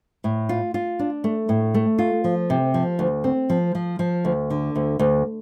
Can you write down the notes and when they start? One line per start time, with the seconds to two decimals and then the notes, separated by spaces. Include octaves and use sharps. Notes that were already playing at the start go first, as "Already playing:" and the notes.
0.24 A2
0.49 F4
0.74 F4
0.99 D4
1.24 A3
1.49 A2
1.74 A3
1.99 F4
2.24 F3
2.50 C3
2.74 F3
2.99 D2
3.24 C4
3.50 F3
3.75 F3
3.99 F3
4.25 D2
4.50 D3
4.76 D2
4.99 D2